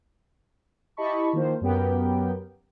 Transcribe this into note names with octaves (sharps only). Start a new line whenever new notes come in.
E4 G4 D#5 A5 B5 C#6
D#3 F3 A#3 C5
F#2 F#3 B3 G4 A#4 G5